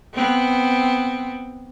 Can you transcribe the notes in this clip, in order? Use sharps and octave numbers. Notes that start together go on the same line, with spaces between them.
B3 C4